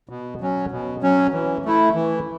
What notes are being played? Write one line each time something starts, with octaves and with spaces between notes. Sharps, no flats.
B2
F#3 C#4
B2
F#3 C#4
E3
A3 E4
E3